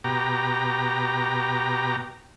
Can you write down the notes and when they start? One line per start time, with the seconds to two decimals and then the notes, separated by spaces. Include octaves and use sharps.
0.04 B2 G4 A#5